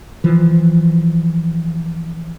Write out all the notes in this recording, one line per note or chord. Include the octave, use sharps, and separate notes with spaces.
E3 F3